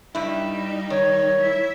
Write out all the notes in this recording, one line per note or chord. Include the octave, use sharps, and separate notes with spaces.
G2 G3 D#4 E4
D#3 C#5
E4 E5